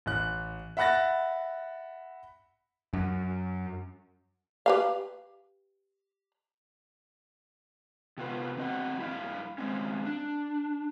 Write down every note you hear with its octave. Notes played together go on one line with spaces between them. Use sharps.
A1 F#6
E5 F#5 B5 F#6 A6 A#6
F#2
G4 B4 F5
C3 B3 F4 B4
E2 C4 D#5 F#5
G2 E4 F5
G#3 C4 C#4
D4